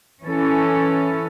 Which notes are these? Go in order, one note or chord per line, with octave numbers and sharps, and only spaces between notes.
E3 C#4 A4